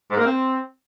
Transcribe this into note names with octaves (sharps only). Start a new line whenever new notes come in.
G#2
A#3
C4